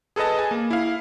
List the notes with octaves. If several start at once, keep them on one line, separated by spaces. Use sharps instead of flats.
G#4 A4 B4 D#5 A5
G#5
A#3
E4 F5